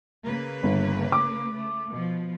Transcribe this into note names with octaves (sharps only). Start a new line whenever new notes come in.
C#3 A#3 B4
G1
D6
A3
B2 F3